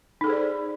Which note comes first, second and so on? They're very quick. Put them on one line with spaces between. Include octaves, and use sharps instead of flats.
D#4 A4 G#4 C5 D5